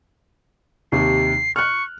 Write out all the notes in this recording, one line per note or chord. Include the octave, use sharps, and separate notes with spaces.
D#2 C3 C7
C#6 F6 F#6